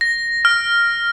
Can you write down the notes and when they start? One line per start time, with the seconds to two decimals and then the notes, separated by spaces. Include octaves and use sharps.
0.01 A#6
0.45 F6